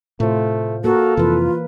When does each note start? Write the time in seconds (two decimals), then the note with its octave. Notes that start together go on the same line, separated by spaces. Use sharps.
0.20 A2 C3 A3 F4 C5
0.84 A#3 F#4 A4 A#4
1.17 F2 C3 E3 F4 B4